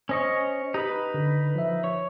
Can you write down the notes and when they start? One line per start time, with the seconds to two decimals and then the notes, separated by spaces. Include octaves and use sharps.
0.09 C#4 C5 D#5 C#6
0.74 D#4 G4 B4
1.14 D3
1.55 F3 E5
1.84 C#5